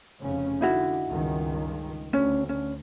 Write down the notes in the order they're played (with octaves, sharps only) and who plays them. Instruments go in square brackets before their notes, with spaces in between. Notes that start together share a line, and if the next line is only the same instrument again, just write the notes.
[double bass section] F1 C#3 C#4
[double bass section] D3 [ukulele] D#4 E4 F#4
[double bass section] C#2 G2 D#3
[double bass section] D2 [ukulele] C#4
[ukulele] C#4